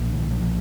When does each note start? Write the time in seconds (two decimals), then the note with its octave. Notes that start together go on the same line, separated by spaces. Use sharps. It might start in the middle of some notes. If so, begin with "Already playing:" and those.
Already playing: B1 A#2
0.12 D#3
0.31 F#3
0.40 F3